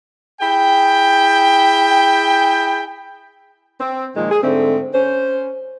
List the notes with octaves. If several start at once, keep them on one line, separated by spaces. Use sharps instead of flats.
E4 G#4 G5
C4
A#2 D#3 F3 G#3
G#4
G#2 D3 A3 C4
C#4 C5